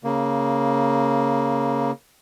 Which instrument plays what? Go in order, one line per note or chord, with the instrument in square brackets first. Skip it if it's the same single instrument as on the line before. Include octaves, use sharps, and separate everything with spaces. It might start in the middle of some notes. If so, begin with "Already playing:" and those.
[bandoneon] C#3 A#3